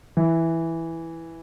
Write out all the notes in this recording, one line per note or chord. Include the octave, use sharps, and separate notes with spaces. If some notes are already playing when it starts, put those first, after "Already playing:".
E3